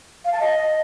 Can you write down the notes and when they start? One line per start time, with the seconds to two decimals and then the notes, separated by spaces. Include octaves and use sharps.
0.25 F5
0.32 A5
0.40 D#5